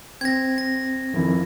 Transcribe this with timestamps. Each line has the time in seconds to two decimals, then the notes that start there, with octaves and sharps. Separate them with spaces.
0.21 C4 G#6 A#6
0.58 A#6
1.14 F2 D#3 E4